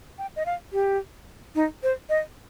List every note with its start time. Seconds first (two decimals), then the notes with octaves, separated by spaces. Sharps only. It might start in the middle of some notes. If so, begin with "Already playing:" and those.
0.18 G5
0.36 D#5
0.46 F5
0.73 G4
1.55 D#4
1.83 C5
2.09 D#5